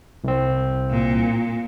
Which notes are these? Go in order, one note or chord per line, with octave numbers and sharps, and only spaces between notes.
C2 C4
A#2